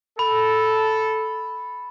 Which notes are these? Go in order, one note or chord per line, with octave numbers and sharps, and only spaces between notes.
A4 B5